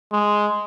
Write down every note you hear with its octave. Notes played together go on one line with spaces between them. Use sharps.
G#3